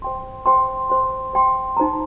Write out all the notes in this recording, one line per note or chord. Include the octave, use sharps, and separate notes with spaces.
C5 G5 C6
C5 G5 C6
C5 G5 C6
C5 G5 C6
D#4 C5 G5 A#5